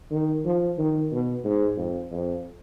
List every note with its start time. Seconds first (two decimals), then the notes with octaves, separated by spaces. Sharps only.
0.11 D#3
0.45 F3
0.78 D#3
1.12 B2
1.45 G#2
1.77 F2
2.11 F2